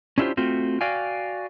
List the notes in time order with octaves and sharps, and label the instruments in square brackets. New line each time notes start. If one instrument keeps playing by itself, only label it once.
[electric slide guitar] C#4 D4 E4 F4 G4 C5
A3 C4 F4 F#4
F#4 D5 F5 G5 G#5